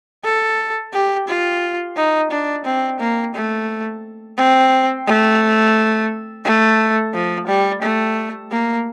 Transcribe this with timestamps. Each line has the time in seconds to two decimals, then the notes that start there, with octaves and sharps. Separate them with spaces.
0.24 A4
0.93 G4
1.28 F4
1.96 D#4
2.31 D4
2.65 C4
3.00 A#3
3.35 A3
4.37 C4
5.07 A3
6.44 A3
7.13 F3
7.47 G3
7.82 A3
8.51 A#3